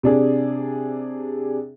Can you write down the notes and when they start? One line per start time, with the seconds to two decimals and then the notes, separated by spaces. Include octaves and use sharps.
0.03 C3 D4 G#4